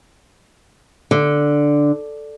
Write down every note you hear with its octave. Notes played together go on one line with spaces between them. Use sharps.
D3